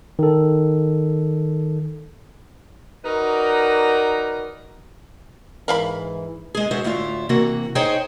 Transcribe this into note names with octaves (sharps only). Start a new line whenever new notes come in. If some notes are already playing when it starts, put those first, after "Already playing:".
D#3 A4
D#4 F#4 A#4 B4 D5
G#2 E3 A#4 F5 B5
G#3 G#4
G#3 F#4 C5 E5
D2 A2 E4 F4
C3 E3 A#3 F#4
D#4 G#4 C5 C#5 D#5 G5